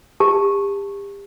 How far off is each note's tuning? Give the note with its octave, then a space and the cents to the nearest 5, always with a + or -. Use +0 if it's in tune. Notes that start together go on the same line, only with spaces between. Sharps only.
G4 +35 A5 +0